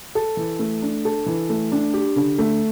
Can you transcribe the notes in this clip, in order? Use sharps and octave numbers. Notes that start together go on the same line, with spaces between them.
A4
E3
A3
D4
A4
E3
A3
D4
G4
D3
A3